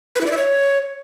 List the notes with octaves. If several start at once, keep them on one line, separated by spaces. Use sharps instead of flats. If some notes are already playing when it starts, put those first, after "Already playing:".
B4
E4
D5
E5
C#5